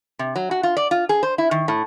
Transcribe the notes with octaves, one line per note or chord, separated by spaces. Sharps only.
C3
F#3
F#4
F4
D5
F4
G#4
C5
E4
D#3
A2